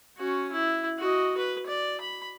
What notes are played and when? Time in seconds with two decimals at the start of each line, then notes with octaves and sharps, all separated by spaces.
0.17 C#4 F#4
0.52 E4
0.98 F#4 D#5
1.37 B4
1.66 D5
2.01 B5